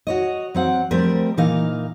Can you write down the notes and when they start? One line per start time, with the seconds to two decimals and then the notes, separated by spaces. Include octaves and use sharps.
0.07 F#4 C#5 D#5
0.55 F#3 C4 F#5
0.91 F3 G3 A3 C4 A#4
1.37 A#2 E3 D#4 A#4 F5